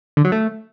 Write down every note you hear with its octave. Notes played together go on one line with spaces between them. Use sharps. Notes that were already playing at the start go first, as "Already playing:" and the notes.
D3
F#3
A3